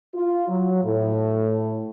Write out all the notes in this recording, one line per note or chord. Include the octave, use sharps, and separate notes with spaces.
F4
F#3
A2